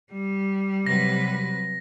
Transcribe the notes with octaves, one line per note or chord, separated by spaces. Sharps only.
G3
C3 F#3 B4 A#6